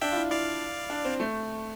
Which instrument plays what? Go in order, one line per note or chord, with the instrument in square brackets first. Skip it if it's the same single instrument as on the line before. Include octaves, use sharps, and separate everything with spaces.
[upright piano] D4 [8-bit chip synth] E5 G5
[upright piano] F4
E4
[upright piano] E4 [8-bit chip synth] D5 F5
[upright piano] D4
C4
A3